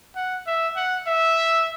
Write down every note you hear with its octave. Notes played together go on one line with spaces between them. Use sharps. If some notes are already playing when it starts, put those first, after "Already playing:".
F#5
E5
F#5
E5